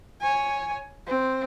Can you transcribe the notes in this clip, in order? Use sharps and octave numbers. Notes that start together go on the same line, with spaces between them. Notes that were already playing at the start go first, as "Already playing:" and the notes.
C#5 G#5
C4